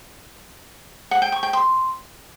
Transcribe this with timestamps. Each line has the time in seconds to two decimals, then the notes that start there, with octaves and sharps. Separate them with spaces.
1.11 F#5
1.22 G5
1.32 C#6
1.43 G5
1.53 C6